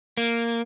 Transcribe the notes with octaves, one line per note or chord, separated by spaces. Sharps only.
A#3